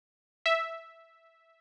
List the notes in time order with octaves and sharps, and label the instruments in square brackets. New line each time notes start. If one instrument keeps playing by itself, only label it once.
[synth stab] E5